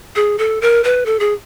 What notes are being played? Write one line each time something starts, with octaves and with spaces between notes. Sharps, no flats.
G#4
A4
A#4
B4
A4
G#4